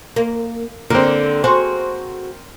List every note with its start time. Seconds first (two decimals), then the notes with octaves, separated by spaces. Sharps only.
0.16 A#3
0.90 D3 A#3 C4
1.44 F#4 G#4 C5